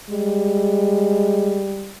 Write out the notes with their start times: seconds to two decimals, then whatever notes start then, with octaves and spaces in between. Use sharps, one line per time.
0.10 G3 G#3